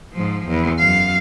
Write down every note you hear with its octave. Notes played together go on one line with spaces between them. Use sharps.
G#2 F3
E2
F#2 F5